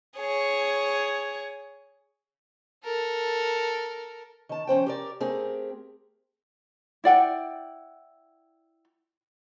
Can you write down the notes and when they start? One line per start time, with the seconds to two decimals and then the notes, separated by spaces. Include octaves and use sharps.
0.17 G#4 C#5
2.84 A4 A#4
4.49 D#3 A5
4.67 F3 C#4 C5 G5
4.86 G4 A#4 D5
5.20 A3 C4 G4 G#4 A#4
7.04 E4 D5 F#5 G5